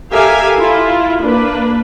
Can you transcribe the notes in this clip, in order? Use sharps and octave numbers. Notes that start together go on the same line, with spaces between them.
G4 A4 A#4 E5 F5 G#5
E4 F4
A#3 D4 B4